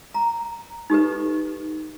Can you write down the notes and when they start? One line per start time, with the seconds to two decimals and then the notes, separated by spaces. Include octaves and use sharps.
0.14 A#5
0.90 D#4 G4 A4 B4